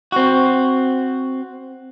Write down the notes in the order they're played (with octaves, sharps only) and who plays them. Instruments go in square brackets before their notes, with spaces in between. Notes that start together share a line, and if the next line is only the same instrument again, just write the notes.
[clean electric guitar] C4 F#4